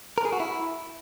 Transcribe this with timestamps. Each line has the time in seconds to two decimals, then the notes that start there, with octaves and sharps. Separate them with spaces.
0.18 A#4
0.25 G#4
0.33 F#4
0.40 E4